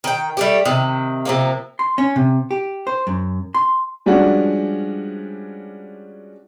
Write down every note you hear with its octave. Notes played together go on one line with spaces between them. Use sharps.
D#3 G5
G3 A3 G4
C3 D#3
C3 F3 A#3
C6
C#4
C3
G4
C5
F#2
C6
F3 G3 G#3 C#4 D4 F#4